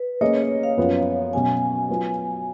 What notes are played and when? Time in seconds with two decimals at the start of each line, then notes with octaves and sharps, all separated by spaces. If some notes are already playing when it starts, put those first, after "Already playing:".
Already playing: B4
0.21 A#3 C#4 G#4 C#5 D#5
0.35 C#5
0.63 F5
0.77 F#2 F3 B3
1.33 B2 F#3 C#4 G#5
1.89 F#3 B3 F4